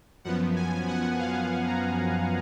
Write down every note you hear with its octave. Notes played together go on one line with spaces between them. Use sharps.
F#2 F3 B3 F#5
G#5
F#5
F5
A#5